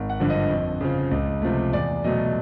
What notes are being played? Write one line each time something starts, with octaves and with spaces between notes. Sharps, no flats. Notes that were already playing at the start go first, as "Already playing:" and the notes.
Already playing: G#1
F#5
G2 D3 F3
D#5
F2
C#3 F3
C#2
C3 F3 A3
E2 D5
B2 F#3 A3 D#5